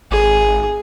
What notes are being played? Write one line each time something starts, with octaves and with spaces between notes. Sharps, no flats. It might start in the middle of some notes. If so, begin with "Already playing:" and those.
G#1 G#4